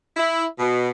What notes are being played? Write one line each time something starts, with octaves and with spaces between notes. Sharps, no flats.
E4
B2